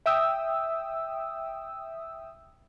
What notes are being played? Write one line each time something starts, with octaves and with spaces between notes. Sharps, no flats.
E5 G5 D#6 E6